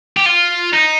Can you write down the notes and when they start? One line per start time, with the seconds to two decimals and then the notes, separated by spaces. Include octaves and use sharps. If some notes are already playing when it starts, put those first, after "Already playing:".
0.17 G4
0.26 F4
0.73 D#4